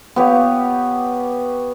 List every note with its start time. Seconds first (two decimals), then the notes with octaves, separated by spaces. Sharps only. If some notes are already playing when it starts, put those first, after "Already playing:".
0.16 B3 G4 C#5 F5